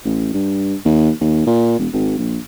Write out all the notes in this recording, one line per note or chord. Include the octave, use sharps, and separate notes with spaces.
A1
G2
D#2
D#2
A#2
E1
G#1
A#1